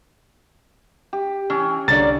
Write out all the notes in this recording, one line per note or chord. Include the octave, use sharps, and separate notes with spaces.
G4
E3 C#4
C2 D3 A#3 C#5 D5 A6